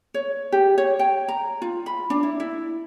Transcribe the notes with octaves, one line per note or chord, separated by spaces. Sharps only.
C#5
G4
C#5
G5
A#5
F4
B5
D4
E4
E4